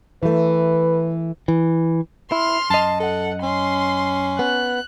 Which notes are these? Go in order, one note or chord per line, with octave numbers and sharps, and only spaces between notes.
E3 A3 B4
E3
E4 C6 F6
F#2 D#5 A5
A4 F#5
C#4 C6
B3 F#6